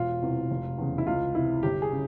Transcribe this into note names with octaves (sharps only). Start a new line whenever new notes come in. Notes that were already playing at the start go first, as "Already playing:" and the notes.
Already playing: E1 F4
E2 C3 E3
F1
E2 C#3
E4
C#2 F4
C3 E3 E4
G1 G4
G#4
C#3